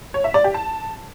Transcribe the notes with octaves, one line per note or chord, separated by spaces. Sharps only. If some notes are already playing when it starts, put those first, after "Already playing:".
C#5
E5
D5
G4
A5